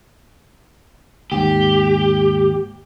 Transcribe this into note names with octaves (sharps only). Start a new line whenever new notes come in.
D#2 G#2 G4